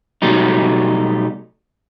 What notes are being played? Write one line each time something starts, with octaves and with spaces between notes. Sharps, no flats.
B2 F#3 G3 A3 D#4